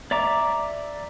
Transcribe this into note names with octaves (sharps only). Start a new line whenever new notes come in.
D5 E5 A#5 D6